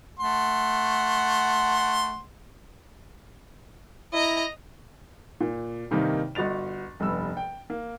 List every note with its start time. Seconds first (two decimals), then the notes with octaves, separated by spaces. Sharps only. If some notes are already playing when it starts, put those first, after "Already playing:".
0.20 A3 F#5 C6
4.13 E4 D#5 A#5
5.40 A#2
5.91 G2 C3 D#3 A#3 D#4
6.35 G1 F#4 D#5 A6 F7
7.00 F1 G2 B3 E6
7.37 G5
7.70 A#3